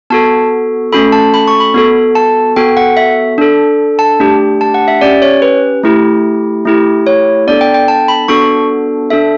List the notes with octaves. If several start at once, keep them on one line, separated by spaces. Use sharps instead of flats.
B3 F#4 A4 A5
A3 C#4 F#4 A4 B5
A5
B5
C#6
B5
B3 F#4 A4
A5
B3 F#4 A4 G5
F#5
E5
D4 A4
A5
A3 D4 G4
A5
F#5
E5
C#4 G4 D5
C#5
B4
A3 E4 G4
A3 E4 G4
C#5
B3 D4 A4 D5
G5
G5
A5
B5
B3 D4 F#4 A4 C#6
D4 A4 E5